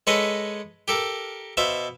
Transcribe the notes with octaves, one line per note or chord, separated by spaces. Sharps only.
G#3 A4 B4 C#5 D#5
G4 A4 A#4
B2 C5 E5 F5